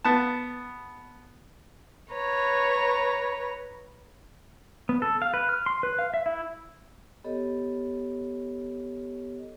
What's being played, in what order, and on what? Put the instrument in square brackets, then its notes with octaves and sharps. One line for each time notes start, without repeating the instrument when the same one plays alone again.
[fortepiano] B3 A5
[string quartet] B4 C#5 A#5
[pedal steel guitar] B3
A4
F5
B4
F6
C6
B4
F5
E5
E4
[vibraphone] B3 G4 A4 C#5 D#5